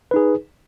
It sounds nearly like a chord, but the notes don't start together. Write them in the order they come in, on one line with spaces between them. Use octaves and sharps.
B4 D#4 G#4